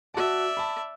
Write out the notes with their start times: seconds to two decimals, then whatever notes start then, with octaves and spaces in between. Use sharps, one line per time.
0.14 F#4 D5 E5 A5
0.57 A5 B5